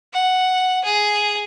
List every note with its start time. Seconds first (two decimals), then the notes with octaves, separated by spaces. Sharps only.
0.13 F#5
0.85 G#4